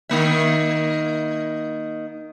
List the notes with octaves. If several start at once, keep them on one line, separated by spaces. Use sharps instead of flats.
D#3 A#3 E5